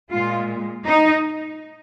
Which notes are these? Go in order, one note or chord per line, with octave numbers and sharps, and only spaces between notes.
A#2 G#3 F4
D#4